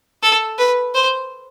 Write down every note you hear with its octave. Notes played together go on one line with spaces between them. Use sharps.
A4
B4
C5